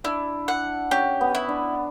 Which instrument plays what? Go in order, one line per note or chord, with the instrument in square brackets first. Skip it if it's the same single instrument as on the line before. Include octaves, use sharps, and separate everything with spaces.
[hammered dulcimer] D4 [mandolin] E4
[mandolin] F#5
[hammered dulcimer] C#4 [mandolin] G4
[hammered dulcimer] B3
[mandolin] E4
[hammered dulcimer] D4